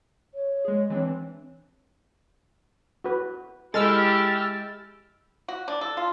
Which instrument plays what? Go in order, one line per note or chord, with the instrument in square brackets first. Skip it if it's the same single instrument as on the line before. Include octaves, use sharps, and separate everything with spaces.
[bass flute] C#5
[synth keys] G#3 G#4
E3 C4 D4
[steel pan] F#4 B4
[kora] G#3 [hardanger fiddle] E4 G4 [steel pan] A4 [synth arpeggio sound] E6 F6 A6
[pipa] F#4
D4
A4
F4